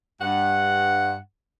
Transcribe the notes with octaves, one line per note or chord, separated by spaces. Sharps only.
G2 F#5